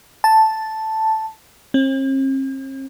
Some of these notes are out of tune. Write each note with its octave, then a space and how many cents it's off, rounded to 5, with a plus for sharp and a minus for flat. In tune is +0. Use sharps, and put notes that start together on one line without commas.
A5 +0
C4 +45